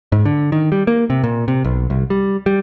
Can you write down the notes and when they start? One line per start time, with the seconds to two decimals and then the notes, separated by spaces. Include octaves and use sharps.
0.12 G#2
0.25 D3
0.52 D#3
0.72 G3
0.87 A#3
1.10 C3
1.23 A#2
1.48 C3
1.64 B1
1.90 C2
2.10 G3
2.46 G3